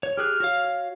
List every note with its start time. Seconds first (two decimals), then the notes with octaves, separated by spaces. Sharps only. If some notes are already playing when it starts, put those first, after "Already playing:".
0.03 C#5
0.18 G4 G#4 F6 F#6
0.40 F#4 C#5 F5